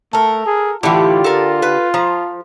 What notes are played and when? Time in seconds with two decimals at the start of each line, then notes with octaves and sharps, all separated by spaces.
0.13 A3 A4 A#4
0.46 G#4
0.83 A2 D3 E3 F4 G4
1.24 A4 A#4
1.62 B4
1.94 F3 A#5